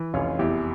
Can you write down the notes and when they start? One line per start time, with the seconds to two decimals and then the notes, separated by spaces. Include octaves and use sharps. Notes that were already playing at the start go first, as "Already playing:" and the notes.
Already playing: E3
0.14 F1 C#4 F4
0.39 E2 E4 G4